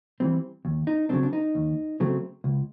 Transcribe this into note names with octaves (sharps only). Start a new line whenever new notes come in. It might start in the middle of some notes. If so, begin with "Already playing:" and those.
E3 G3 C4
D#2
D#4
C#3 F#3 A3 C4 D4
D4
D#4
D#2
C#3 F#3 A3 C4
C#2